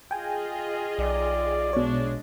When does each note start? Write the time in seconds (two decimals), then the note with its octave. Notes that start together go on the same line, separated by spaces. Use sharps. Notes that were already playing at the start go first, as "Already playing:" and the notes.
0.11 F4 G#4 D#5 G5 G#5
0.98 B1 D5
1.73 B2 G#3 D4 C#5